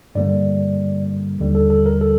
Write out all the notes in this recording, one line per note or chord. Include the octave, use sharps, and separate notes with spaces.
G2 D3 G3 A#3 D5
D#2 D3 G3
A4
A4
A#4
A4